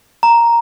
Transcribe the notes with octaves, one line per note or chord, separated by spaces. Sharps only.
A#5